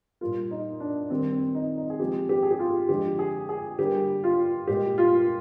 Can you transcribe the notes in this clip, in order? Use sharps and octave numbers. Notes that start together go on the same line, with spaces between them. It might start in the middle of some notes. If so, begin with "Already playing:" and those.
A#2 G3 A#3 F4
D#4
D4
D#3 G3 A#3 C4
C4
D#4
D#4
G#4
C3 F3 G#3 G4
G4
G#4
G4
F4
D3 F3 G#3 G4
G#4
G#4
D3 G3 A#3 G4
F4
A#2 G#3 G4
F4